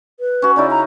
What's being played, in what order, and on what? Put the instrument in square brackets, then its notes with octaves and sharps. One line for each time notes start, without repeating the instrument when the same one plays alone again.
[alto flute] B4
[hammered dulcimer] C#4 F#4
[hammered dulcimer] C#3 D#4 E4 [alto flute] D5
[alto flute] A#5